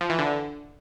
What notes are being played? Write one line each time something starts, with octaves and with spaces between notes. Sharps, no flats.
F3
E3
D3